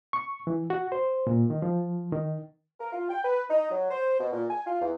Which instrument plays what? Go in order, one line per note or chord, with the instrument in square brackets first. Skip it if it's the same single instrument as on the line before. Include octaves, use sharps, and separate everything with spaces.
[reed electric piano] C#6
E3
F#4
C5
A#2
D#3
F3
D#3
[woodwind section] A#4
F4
G5
B4
D#4
F#3
C5
B2
A#2
G#5
F4
E2